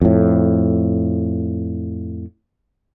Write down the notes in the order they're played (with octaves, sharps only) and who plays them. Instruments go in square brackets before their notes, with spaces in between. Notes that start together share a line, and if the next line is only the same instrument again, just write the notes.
[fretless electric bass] F2 A2